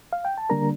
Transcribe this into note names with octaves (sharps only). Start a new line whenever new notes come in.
F5
G5
A5
D3 G3 A#3 D4 A#4 A#5